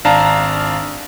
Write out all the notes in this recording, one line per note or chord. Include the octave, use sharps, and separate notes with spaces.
G#1 D4 F5 A5 A#5